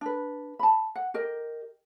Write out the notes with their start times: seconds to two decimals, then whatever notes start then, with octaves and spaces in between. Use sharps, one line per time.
0.01 D4 B4
0.59 A5 B5
0.95 F#5
1.14 G4 A#4 D#5